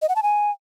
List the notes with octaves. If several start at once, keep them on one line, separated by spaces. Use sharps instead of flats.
D#5
F#5
A5
G#5